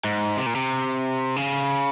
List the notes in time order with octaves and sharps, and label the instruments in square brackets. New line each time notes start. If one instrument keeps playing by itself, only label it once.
[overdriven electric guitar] G#2
C3
A#2
C3
C#3